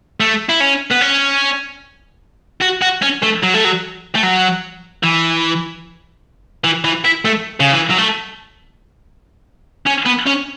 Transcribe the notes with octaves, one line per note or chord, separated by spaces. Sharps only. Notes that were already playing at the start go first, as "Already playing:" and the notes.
A3
E4
C#4
B3
C#4
F#4
F#4
C#4
A3
F#3
A3
F#3
A3
F#3
E3
E3
E3
E4
A3
C#3
E3
F#3
A3
C#4
B3
C#4